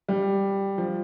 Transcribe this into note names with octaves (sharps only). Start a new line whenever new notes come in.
G3
F3